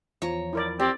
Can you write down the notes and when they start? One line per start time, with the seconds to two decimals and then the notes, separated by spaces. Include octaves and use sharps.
0.22 E2 F3 C#5 A#5
0.53 E4 A#4 D5
0.80 C4 G4 D5